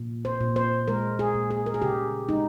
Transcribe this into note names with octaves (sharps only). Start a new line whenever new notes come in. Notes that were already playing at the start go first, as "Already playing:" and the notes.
Already playing: A#2
C5
A#2
C5
G#3 A#4
G#4
A#2
G#4
A#4
G#4
C#3 G4
G#3 D#4